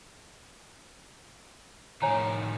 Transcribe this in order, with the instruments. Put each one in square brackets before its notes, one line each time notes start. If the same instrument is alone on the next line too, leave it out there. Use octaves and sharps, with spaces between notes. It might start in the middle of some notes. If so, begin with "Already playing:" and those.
[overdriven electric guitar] A2 D#3 [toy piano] C#5 G#5 A#5